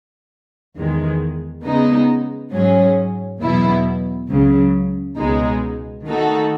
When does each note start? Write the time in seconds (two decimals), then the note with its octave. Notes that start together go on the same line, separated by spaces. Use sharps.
0.76 E2 D#3 G#3
1.64 C#3 G#3 B3 D#4
2.53 G#2 F#3 C#4 G#4
3.41 E2 B2 F#3 B3 E4
4.29 C#2 C#3 F#3
5.17 C#2 B2 G#3 D#4
6.05 D#3 A3 D#4 F#4 A4